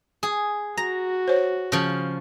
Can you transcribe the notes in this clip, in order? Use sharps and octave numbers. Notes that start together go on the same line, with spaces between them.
G#4
F#4 A#5
C5 C#5
C#3 F3